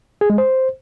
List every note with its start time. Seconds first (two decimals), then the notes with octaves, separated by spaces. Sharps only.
0.21 G#4
0.30 G#3
0.38 C5